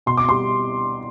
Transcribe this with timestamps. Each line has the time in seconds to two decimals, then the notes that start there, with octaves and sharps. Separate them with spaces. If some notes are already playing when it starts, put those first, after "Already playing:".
0.06 B2 C6
0.17 D6
0.29 G3 C6